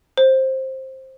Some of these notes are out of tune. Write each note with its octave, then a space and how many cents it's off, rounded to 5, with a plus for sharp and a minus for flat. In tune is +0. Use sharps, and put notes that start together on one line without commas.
C5 +15